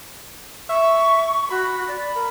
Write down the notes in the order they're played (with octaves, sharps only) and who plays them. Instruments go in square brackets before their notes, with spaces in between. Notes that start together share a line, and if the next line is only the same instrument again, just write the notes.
[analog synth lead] E5 [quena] C#6
[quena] F#4 [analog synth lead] B5
[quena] D5
A#4